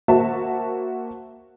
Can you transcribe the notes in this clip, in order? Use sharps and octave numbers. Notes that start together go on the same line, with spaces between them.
A#3 F#4 C5 E5 A5